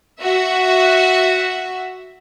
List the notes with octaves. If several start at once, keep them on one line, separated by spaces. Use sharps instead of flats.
F#4 E5